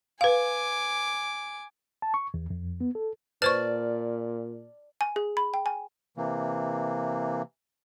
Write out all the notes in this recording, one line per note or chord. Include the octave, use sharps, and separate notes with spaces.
B4 F5 G#5 D6
A5
C#6
E2
F2
B3
A4
A#2 B4 C5 D5 A5 C#6 F6 A6
G#5
G#4
B5
G5
G#5
C3 E3 A#3